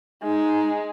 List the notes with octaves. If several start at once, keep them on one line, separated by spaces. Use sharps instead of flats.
G#3 D#4